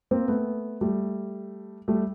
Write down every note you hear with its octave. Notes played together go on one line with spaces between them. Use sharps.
A#3 C4
A3 B3
G3 A3
G3 A3